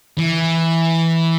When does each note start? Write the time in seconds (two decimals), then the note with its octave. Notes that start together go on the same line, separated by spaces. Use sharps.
0.18 E3